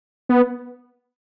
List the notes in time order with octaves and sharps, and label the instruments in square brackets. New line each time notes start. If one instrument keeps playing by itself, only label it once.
[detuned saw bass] B3